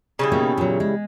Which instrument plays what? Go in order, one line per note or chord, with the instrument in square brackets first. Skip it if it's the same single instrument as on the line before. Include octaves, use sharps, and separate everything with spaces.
[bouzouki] C#3 G3 E4
[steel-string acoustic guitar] B2 A#3 D#4
A#2 F#3
G#3